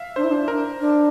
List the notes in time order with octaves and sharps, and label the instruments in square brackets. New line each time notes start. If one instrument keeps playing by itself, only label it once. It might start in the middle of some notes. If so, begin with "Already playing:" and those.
Already playing: [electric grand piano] E5 F5
[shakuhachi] D4 [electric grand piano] C5
[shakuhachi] E4
D4
[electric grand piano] A#4
[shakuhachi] D4